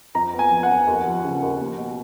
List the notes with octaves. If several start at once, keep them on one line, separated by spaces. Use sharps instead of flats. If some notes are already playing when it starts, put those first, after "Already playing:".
F2 A#5
B3
G#5
F3
F#5
F2
D#2
F3
C#3
D#2
A#3
B2